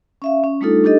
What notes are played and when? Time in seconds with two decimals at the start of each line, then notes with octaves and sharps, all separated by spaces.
0.22 C#4 E5 F5
0.44 C#4
0.61 G3 A3 D4 D#4 F4 A4
0.84 D4 D#4 G4 A4 D#5